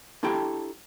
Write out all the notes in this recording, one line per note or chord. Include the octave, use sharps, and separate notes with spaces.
D4 E4 G4 A4 G5 A#5